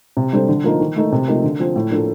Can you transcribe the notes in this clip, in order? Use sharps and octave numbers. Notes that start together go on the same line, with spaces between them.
C3
G3 D4 A4 C5
D3
F3 A#3 D#4
D#3
A3 D#4 A#4
C3
F3 A3 D#4 A#4
D3
F3 C4
A2
F3 A#3 D4 A4